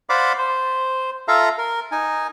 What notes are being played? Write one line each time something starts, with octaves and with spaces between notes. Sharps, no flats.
C5 D5 F5 F#5 B5 D6
C5
F4 A4 E5 F5 A#5
A#4
D#4 G#5